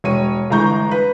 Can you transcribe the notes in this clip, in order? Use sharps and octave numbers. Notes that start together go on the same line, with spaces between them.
E1 C#5 D#7
G1 E3 G#3 A#5 C#6 G6
B4